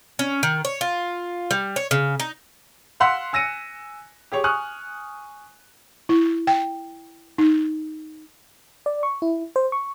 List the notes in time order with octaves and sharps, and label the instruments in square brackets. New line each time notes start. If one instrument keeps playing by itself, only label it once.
[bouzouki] C#4
D#3
C#5
F4
G3
C#5
C#3
D#4
[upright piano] F5 F#5 C6 E6 F#6 B6
G#5 E6 A#6 C#7 D#7
G4 G#4 C#5
G#5 C#6 D#6 F6 F#6
[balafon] E4
G5
D#4
[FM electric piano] D5
C#6
E4
C5
C#6